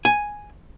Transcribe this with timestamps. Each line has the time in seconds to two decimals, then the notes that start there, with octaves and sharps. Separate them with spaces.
0.05 G#5